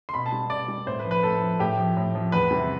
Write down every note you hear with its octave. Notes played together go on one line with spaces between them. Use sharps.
C6
B2 B5
A5
G3
B2 D5
G3
A2 C5
B4
F3
B4
A2 A4
F3
A2 G4
F3
A2
F3
E2 B4
C3 E3 G3